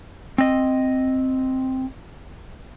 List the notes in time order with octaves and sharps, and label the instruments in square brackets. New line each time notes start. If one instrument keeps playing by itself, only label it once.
[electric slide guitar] C4 D#5